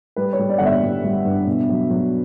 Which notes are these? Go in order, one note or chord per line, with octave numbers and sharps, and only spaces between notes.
G3 B4
C#5
G3
D5
G1 F#5
E5
G3
G3
G2
B2
F#3
F#3